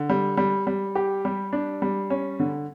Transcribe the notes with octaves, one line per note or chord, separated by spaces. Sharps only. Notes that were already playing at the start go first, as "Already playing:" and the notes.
Already playing: D3
G3
G3
G3
G4
G3
D4
G3
C#4
D3